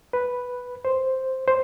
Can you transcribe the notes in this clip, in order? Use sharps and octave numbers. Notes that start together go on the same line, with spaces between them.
B4
C5
C5